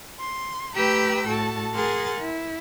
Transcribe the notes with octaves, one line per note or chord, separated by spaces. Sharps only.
C6
A3 G4 B4 G5 A#5 E6
A2 F#4 A4 A5
G#4 A#4 F#5 G#5 C6 A6
E4